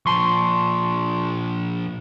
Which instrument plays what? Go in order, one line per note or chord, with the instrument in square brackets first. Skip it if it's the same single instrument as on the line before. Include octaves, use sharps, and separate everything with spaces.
[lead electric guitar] A#2 F3 [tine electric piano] A5 C6 C#6